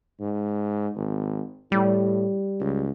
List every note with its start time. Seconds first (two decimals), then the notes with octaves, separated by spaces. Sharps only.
0.20 G#2
0.95 G#1
1.72 A2 G3
2.61 C#2